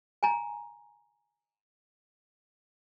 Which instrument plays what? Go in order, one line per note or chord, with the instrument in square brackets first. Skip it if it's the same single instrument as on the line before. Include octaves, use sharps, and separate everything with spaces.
[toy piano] G#5 A#5